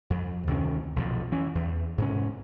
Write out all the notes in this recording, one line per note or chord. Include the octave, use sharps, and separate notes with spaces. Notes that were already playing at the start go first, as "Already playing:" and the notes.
F2
D2 C3 D#3 C#4
B1 F2 A#2
E3 C#4
E2
G#2 C3 C#4